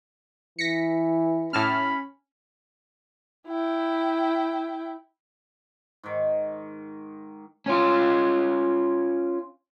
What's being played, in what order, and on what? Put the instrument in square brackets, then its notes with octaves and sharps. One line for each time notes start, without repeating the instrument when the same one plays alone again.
[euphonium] E3 [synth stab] A#6 B6 C#7
[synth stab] A2 A5 F6 [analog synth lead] C#4 [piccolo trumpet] B5
[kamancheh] E4 G5
[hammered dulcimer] G#2 D#3
[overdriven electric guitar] C#4 F4